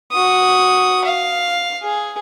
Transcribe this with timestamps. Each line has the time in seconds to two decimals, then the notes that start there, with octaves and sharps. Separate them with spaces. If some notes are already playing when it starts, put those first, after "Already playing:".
0.12 F#4 D#6
1.04 F5
1.83 G#4